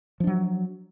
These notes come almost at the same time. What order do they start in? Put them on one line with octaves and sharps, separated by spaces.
F3 D4 F#3